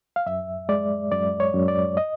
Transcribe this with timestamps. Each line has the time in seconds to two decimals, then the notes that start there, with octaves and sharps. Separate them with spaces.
0.16 F5
0.26 F#2 E5
0.69 G#3 D5
1.12 F#2 D5
1.40 C#5
1.54 F#2
1.68 D5
1.97 D#5